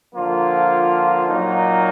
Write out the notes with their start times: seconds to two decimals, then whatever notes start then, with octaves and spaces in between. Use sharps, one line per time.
0.14 D3 F3 A#3 F4
1.28 A#2 F#3 A#3 D#4